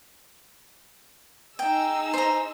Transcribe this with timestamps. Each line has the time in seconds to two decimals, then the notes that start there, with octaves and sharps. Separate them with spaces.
1.59 D#4 G#4 G5 E6
2.14 C5 A#5